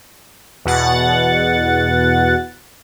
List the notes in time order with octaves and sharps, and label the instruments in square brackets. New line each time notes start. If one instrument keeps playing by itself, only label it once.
[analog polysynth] E2 B2 F#5 A6